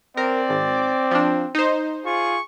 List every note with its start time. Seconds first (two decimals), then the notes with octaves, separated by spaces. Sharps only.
0.17 C4 A#4 D5
0.49 G#1
1.11 F3 D4
1.55 D#4 C5
2.05 F4 G#4 C#6